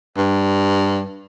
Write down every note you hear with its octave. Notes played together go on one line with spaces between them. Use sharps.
G2